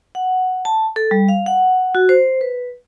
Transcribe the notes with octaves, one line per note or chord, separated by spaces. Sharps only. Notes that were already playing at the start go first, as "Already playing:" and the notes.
F#5
A5
A4
G3
F5
F#5
F#4
C5
B4